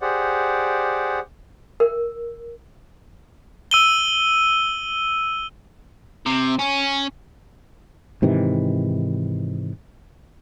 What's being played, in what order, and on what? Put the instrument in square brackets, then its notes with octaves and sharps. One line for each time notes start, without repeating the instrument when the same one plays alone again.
[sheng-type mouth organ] G4 G#4 C5 D5 F#5
[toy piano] A#4
[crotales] E6 D#7 G7
[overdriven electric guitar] C3
C#4
[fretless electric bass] G#2 C3 D#3 E3